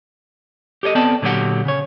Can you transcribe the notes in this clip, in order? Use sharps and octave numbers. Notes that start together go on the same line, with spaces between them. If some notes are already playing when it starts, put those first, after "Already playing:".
G4 A4 C#5 D#5
B3 C4 A4 D5 G5 A5
A#2 D3 F#3 C4 G4 F#5
C#3 C#5